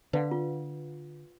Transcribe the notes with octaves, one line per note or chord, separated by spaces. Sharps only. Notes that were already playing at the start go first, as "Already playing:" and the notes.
D3 B4 F5 F#5
F4